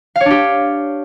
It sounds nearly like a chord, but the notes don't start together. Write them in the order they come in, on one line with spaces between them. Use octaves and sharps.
F5 C#5 D4 G4